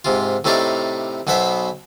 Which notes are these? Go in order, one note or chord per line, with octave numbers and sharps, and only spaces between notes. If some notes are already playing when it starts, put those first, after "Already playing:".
G#2 C3 F4
A2 C3 A3 D#4 D5 F5
B1 B2 B3 C5 E5 B5